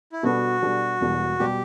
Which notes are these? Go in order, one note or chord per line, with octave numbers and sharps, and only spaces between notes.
E4
B2 G3 B3 D4 F#4 A4
B2 G3 B3 D4 A4
E1 E2 B2 G3
B2 G3 G4